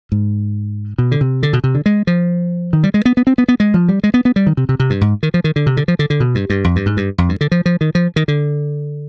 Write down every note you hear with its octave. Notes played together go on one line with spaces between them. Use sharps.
G#2
B2
D3
C3
D3
B2
C3
D3
G#3
F3
D#3
G3
G#3
B3
B3
C4
B3
B3
G#3
F3
G3
G#3
B3
B3
G3
D#3
C3
C3
C3
G2
G#2
D#3
F3
D#3
D3
C3
D3
F3
D3
D3
B2
G2
G2
F2
G2
G#2
G2
F2
G2
D3
F3
F3
D#3
F3
D#3
D3